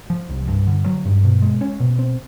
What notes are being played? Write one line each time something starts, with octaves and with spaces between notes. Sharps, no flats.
F3
C2
G2
D3
F#3
G2
B2
G#3
C#4
B2
C4